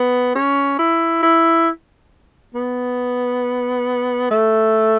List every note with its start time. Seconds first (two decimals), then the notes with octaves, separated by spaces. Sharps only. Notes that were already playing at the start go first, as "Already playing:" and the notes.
Already playing: B3
0.35 C#4
0.79 E4
1.23 E4
2.55 B3
4.31 A3